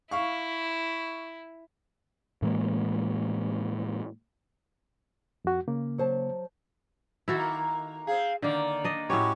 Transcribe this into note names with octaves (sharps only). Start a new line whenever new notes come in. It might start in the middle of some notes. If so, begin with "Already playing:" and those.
E4 F5 C#6
A2 E3 G#3 A#3
F2 F#4
C#3 A#3
F#3 C5 A5
D#3 A#3 E4 F#4 A4
C4 G#4 F5
D3 D#3 A#3 D5
D4 D#5
A2 C#4 F#4 G4 C#5 B5